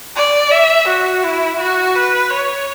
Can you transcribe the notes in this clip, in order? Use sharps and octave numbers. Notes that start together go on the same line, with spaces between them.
D5
E5
F#4
E4
F#4
B4
C#5